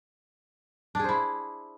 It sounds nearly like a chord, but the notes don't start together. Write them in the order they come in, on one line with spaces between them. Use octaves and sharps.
D4 G#4 C5 E4